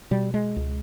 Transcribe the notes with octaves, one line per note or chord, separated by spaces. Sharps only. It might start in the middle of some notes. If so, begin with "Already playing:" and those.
B2 G3
G#3
C#2